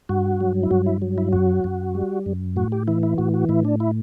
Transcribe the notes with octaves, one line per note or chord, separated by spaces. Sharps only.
G2 F#4
F#3
E4
G2 F#4
E4
F#3
E4
F#2 F#4
F#2
G3
F#2
A2 F#4
G4
E3 E4
E4
A2 F#4
F#4
A2 E4
D4
E4